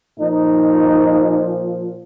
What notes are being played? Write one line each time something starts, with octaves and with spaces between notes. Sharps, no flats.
A#2 F3 D#4